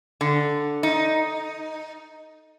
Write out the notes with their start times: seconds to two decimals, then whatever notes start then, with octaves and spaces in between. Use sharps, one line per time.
0.21 D3
0.83 D#4